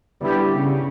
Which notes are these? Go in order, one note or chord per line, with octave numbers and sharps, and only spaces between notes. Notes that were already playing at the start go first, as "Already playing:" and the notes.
D3 G3 B3 E4 G4
C#3